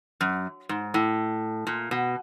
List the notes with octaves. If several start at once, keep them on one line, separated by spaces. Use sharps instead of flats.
F#2
G#2
A2
A#2
B2